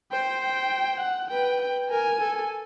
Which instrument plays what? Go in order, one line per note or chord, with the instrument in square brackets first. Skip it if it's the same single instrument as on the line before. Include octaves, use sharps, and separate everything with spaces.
[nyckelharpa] C5 [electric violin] G5
[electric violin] G5
F#5
[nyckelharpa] B4 [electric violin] G5
[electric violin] G5
[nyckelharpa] A#4 [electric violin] G#5
[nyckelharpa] A4